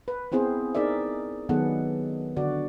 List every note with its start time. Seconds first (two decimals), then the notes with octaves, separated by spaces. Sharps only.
0.08 B4
0.32 B3 C4 E4 G#4 C5
0.75 D#4 G#4 A#4 D5 E5
1.49 D#3 F#3 G#3 B3 A4 F#5
2.37 D3 F#4 D5